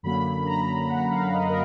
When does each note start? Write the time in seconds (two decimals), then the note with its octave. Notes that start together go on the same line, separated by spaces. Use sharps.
0.03 F#2 D3 F#3 A#3 B5
0.46 A#5
0.89 F#5
1.11 F5
1.33 D#5
1.49 A#4